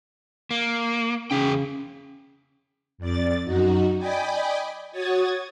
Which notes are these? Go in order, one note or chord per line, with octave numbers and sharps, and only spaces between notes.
A#3
E2 C#3 G#4 G5
F2 D5 A6
F#2 D#4 F#4
D5 D#5 G5 G#5 B5 D6
F#4 C#5 D#6 G#6 A6